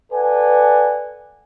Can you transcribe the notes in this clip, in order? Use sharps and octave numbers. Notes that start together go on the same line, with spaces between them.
A4 B4 D5 F#5 G#5